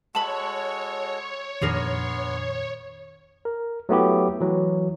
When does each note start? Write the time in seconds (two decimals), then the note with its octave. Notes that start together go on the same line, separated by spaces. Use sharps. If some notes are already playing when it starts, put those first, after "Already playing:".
0.15 G#3 F#4 A4 C#5 A5 B5
1.62 F2 A#2 D#3 B3 D4 G#4 A#4 C6
3.45 A#4
3.89 F#3 A3 B3 E4 G4
4.41 E3 F#3